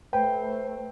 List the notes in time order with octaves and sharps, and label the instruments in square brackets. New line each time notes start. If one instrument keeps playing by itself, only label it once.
[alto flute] A3 [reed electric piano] B4 [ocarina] C5 [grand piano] G5